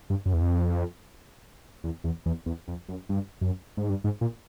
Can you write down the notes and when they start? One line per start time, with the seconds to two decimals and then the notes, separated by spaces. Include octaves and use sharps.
0.10 G2
0.26 F#2
0.33 E2
0.41 F2
1.84 E2
2.04 E2
2.26 E2
2.46 E2
2.68 F2
2.89 F#2
3.09 G2
3.41 F#2
3.77 G#2
3.89 G2
4.04 G#2
4.21 A#2